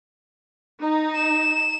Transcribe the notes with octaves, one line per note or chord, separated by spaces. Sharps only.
D#4
E7